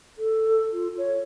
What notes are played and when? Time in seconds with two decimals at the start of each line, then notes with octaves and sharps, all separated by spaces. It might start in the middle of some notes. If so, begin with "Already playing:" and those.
0.18 A4
0.73 F4
0.98 C#5